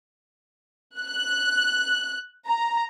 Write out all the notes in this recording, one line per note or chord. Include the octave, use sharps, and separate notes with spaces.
F#6
A#5